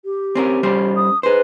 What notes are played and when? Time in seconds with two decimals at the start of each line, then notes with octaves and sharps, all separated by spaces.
0.05 G4
0.35 C4 C#4 A#4
0.63 G3 C#4 C5
0.96 D#6
1.23 G#4 B4 C5